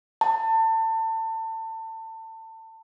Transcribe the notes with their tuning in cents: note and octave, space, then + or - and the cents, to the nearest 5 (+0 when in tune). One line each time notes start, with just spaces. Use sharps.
A5 +30